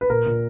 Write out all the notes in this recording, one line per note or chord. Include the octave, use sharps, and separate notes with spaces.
B4
A#2 A#4
A#2